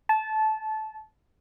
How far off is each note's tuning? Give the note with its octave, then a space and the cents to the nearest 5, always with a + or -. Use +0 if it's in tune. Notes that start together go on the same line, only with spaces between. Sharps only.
A5 -20